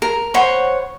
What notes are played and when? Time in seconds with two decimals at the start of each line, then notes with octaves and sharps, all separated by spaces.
0.02 A#4
0.34 C5 C#5 F#5 B5